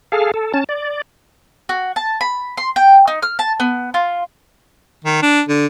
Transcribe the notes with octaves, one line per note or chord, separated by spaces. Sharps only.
G#4 A4 F5
A4
C#4 A5
D5
F#4
A5
B5
C6
G5
D#4
F6
A5
B3
F4
D#3
D4
D3